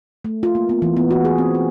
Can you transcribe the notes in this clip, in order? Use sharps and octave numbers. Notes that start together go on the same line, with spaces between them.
A3
F4
A#3
B3
E3
B3
F#4
G#4
C4
G#4